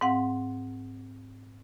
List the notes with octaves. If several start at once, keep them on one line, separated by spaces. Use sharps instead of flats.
G#2 C4 F5 F#5